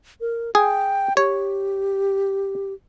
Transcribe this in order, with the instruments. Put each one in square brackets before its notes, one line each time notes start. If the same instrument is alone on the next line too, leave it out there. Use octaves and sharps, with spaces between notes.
[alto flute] A#4
[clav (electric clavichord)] G#4 [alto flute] G5
[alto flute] G4 [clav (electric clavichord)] C#5